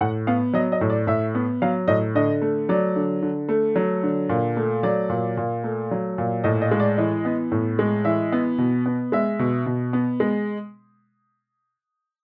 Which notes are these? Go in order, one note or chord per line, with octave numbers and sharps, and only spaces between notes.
A2 F#5
B3 F5
F#3 D#5
D#5
A2
D5
A2 E5
B3
F#3 F5
A2 D#5
D3 D#5
A3
F#3 D5
D3
D3
A3
F#3
D3
A#2
A3
F#3 D5
A#2
A#2
A3
F#3
A#2
A2 D#5
D#5
G#3
D5
E3 D#5
B3
A2
G#3
E3 E5
B3
B2
B3
G#3 E5
B2
B2
B3
G#3